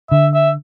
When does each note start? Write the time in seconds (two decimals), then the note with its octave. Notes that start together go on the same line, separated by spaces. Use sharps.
0.11 D3 E5
0.34 E5